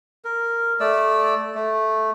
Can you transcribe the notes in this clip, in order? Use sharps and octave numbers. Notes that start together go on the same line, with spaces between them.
A#4
A3 D5 E6
A3